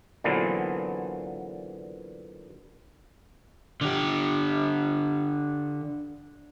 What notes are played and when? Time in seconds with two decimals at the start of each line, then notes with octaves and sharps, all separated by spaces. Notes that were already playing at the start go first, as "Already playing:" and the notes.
0.24 A#2 D3 E3 F#3 B3 C4
3.81 D3 G4